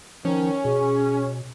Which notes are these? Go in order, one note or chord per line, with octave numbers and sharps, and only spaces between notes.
D#3 F3 C#4
B2 G#4